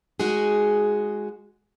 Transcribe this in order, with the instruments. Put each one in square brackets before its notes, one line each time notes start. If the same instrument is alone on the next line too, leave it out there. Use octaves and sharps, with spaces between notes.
[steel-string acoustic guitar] G#3 D#4 F#4 G#4